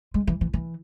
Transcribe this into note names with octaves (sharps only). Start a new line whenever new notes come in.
G#3
E3
E3
E3